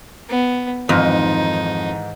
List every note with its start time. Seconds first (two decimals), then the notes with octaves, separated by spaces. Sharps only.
0.29 B3
0.89 F2 G#2 D#3 E3 D#4